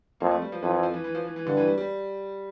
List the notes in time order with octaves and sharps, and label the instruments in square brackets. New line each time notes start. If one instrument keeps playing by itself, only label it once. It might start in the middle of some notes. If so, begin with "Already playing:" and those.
[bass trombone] F2 [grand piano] A#3
[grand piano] A3
G3
F3
[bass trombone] F2 [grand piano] E3
[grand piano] E3
F3
E3
E3
F3
E3
E3
[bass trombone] G2 [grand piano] D3
[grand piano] E3
G3
G3